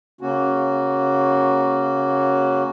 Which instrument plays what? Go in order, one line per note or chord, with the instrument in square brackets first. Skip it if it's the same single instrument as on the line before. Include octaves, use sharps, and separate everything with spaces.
[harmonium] C#3 A#3 C#4 F#4